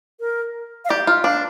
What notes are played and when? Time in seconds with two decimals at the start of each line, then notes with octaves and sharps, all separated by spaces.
0.20 A#4
0.85 F5
0.89 G4 D5
1.07 F4
1.24 D4 F5